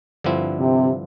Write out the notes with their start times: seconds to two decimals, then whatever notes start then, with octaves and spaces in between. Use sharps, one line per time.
0.24 G2 D3 F3 C4 E4
0.58 C3